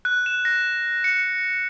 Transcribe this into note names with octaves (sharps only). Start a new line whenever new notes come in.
F#6
E7
A#6
C#7